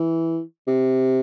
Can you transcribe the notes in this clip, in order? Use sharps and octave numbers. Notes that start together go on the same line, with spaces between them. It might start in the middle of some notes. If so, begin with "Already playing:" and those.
Already playing: E3
C3